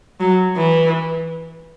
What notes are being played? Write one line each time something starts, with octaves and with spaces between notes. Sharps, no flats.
F#3
E3